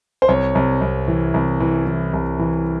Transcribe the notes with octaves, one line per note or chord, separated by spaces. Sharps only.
C5
C2 C#5
C2
C2
E3
C2
E3
E3
C2
E3